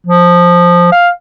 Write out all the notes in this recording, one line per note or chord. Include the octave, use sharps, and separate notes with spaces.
F3
F5